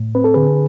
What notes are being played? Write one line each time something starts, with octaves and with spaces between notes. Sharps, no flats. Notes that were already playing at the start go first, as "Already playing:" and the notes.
Already playing: A2
C4 B4
A4
D3 G#4 B4